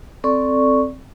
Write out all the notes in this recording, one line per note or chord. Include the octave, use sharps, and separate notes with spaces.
C4 A4 D5 C#6